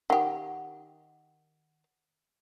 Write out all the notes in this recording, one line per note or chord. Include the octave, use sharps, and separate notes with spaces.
D#3 G4 F#5